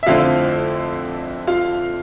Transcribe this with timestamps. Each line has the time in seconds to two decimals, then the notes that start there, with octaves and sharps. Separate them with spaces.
0.03 E5
0.06 F2 D3 A3 C4 E4 F4 F5
1.47 F4 F5